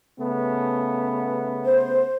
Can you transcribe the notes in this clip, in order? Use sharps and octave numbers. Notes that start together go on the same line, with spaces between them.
C#3 A3 B3
C5